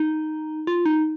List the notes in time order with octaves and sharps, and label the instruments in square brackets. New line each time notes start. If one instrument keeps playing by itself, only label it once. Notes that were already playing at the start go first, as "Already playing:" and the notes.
Already playing: [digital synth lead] D#4
F4
D#4